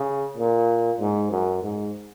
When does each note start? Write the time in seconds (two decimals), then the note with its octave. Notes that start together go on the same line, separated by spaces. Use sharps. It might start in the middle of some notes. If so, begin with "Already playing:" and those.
Already playing: C#3
0.37 A#2
1.00 G#2
1.31 F#2
1.63 G#2